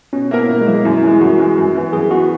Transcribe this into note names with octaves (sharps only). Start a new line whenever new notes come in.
B2 C#4
A#3 B3 E4 A#4
B2 A#3
G#3
F#3 A#3 E4 A#4
G#3
F#2 E4
E3 G#3
E4
F#2 F#4
E3 G#3
F#2
E3 B3
F#2 G#4
E3 B3 F#4